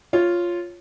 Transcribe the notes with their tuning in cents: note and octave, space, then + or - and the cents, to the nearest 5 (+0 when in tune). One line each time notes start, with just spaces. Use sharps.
F4 +0 C#5 +0